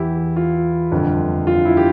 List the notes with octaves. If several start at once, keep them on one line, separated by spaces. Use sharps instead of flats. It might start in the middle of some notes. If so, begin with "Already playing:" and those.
Already playing: E2 E3 E4 G4
F4
G1 F2 D3 F3
F4
E4
G4